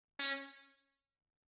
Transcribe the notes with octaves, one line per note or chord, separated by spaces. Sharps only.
C#4